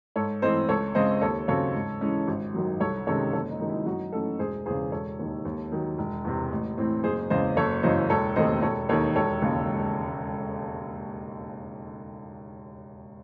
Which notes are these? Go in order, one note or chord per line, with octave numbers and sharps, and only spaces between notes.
G#2 A4 C#5
E3 A3 C4 C5 D#5
C#2 A4 C#5
C#3 G#3 C4 C5 D#5
D#2 A4 C#5
C#3 F#3 C4 A4 C#5
G#2
E3 G#3 C#4
G#1
F#2 D#3 F#3
C2 A4 C#5
C3 D#3 G#3 C#4 A4 C#5
F#1 A4 C#5
D#4
F#2 D#3 G#3
E4
F#2 D#4 F#4
E3 A3 C#4 F#4 A4
E1 G#4 C5
E2 C#3 G#4 C5
E1 A4 C#5
D#2 D#3
D#2
D#3 F#3
E1
E2 C3
A1
A2 E3 C4
F#1 G#4 C5
E2 C#3 G#3 C5 D#5
F#1 A4 C#5
F#2 C#3 E3 C5 D#5
E1 A4 C#5
D#2 D#3 A3 C4 C5 D#5
E1 A4 C#5
D#2 D#3 A4 C#5
E1 A4 C#5
D#2 C#3 G#3